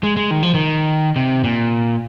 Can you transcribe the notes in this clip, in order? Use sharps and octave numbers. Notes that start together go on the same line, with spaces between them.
G#3
G#3
D#3
F3
D#3
C3
A#2